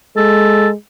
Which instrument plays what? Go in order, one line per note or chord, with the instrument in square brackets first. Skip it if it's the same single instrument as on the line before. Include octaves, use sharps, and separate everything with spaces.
[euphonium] G#3 [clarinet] A4